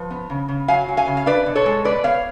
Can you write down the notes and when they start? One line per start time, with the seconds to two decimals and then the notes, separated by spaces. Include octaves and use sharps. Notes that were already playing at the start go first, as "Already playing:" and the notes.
Already playing: F3 B4
0.10 B3
0.30 C#3
0.48 C#3
0.68 F#3 F5 G#5
0.88 F#3
0.97 F5 G#5
1.07 C#3
1.17 F5
1.26 D4 B4 D5
1.46 B2
1.55 A4 C#5
1.66 G#3
1.85 B2 B4 D5
2.04 B3 C#5 F5